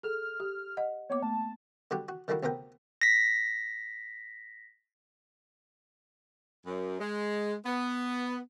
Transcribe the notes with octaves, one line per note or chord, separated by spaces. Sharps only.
G#4 A4 F6
G4
D#5 F#5
A#3 B3 C#5 D6
A3 A5
D3 G3 F#4 G4
F#4
D#3 G3 A3 A#3 E4 F#4
D2 C3 B3 A#4 G5
A#6 B6
F#2
G#3
B3